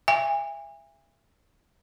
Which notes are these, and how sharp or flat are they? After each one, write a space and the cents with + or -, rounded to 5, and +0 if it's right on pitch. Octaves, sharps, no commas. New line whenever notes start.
E5 +25 G#5 -35